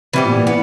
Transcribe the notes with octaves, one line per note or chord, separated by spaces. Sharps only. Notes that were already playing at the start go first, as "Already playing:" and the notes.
C3 E3 G3 B3
A#2
A#2
E3 B3